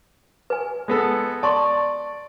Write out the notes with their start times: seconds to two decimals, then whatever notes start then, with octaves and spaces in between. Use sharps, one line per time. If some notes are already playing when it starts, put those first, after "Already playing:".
0.50 B4 G#5
0.88 G#3 B3 A4
1.43 D5 A5 C6 C#6